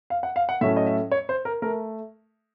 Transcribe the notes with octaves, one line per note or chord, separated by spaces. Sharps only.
F5
F#5
F5
F#5
A2 F#3 A3 C#4 E5
D#5
E5
C#5
C5
A#4
A3 A#4